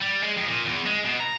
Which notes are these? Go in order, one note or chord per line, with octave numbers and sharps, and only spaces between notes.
G3
G#3
F2
A#2
E2
G#3
B2
A#5